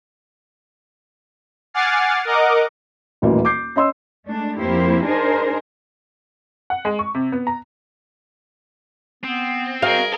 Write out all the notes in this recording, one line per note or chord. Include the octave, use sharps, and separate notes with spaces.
F#5 G#5 D6 F6 A6 C7
A#4 D#5 F#5 D6
D#1 A1 D2 E3 A#3
D6 G6 C7
C#4 D#5 C6 E6
G#3 A3 D4
F2 A#3 E4 G4 C5
D4 D#4 G#4 A#4 C5
F#5
G#3
C#6
C3
B3
A#5
B3 C4
F#4 G#4 A#4 F5